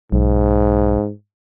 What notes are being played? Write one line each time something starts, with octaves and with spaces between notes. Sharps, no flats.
B1 G#2